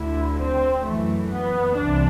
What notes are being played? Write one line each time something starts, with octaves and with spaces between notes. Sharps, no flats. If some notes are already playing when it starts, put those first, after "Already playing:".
Already playing: D2 D3 E4
C4
F#2 E3 A3
B3
C2 C3 E3 D4